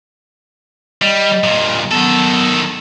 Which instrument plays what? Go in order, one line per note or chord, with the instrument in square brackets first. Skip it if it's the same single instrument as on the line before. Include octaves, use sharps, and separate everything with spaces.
[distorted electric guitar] G3 [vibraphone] D#5
[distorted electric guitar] G2 A#2
[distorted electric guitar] D#3 A4 [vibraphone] F#3 B3